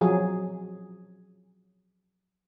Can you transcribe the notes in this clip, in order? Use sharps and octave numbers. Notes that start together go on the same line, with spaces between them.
F3 F#3 G#4